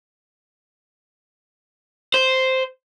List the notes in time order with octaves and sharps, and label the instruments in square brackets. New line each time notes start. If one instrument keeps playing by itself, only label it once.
[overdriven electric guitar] C5